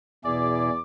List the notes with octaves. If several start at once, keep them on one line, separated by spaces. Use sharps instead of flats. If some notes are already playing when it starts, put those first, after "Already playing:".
E2 B2 E4 G#4 D5 D6